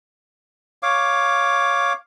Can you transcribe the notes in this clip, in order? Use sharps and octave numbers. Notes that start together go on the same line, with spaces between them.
C#5 F5 D6